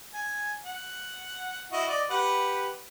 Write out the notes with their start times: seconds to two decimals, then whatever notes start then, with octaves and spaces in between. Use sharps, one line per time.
0.14 G#5
0.65 F#5
1.72 E4 F#4 D#5
1.89 D5 D#5
2.10 G4 B4 F#5